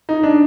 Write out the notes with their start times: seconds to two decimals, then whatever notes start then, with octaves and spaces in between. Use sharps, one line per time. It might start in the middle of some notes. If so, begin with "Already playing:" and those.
0.09 D#4
0.23 D4